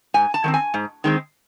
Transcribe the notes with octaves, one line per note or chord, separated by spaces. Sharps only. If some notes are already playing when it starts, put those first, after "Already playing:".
G#2 G#5
A5
D#3 G#3 C4
G#5
G#2
D#3 G#3 C4